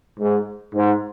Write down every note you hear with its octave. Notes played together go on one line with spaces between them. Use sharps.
G#2
G#2